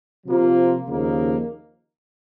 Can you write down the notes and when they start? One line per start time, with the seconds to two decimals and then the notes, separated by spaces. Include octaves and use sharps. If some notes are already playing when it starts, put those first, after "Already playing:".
0.25 C3 F3 A#3 F4
0.86 D#2 C#3 F3 A#3 D#4